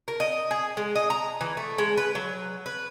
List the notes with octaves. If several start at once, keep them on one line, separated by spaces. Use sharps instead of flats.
A#4
D#5
G#4
G#3
D#5
A#5
E3
A3
G#3
B4
F#3
B4